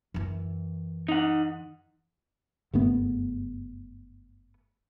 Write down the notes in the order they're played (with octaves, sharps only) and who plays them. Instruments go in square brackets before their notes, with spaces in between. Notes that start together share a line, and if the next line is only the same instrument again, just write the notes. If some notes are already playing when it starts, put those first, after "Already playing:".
[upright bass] F#2 E3
[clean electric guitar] D#4 F#5
[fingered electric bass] F#1 G2 A3 B3